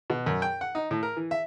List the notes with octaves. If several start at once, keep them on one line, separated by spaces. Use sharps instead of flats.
B2
F#2
G5
F#5
D#4
A2
A#4
E3
E5